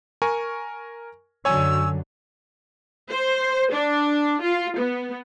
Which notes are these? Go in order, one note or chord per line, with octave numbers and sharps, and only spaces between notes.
A#4 G#5 C#6
F#2 D3 F#3 C#5 G#5 E6
C5
D4
F4
B3